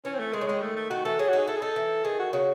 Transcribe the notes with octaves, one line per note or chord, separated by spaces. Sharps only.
E3 C#4
C4
A3
D#3 G#3
C#3
D#3 G#3
A3
A3
D#3 F#4
E3 A4
F#3 G#4
D#4 F#4
G#4
E4 A4
G#4
D#4 A4
E3
D#3 G#4
F#4
C#3 F#4